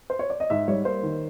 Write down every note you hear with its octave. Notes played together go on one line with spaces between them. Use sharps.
C5
C#5
D5
D#5
G#2 E5
G3 C#5
A#3 C5
D#3